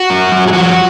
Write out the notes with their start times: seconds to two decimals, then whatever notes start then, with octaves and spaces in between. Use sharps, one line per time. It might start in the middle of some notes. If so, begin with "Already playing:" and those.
Already playing: F#4
0.10 F#2
0.32 F#2
0.48 G#4
0.53 F3 F#4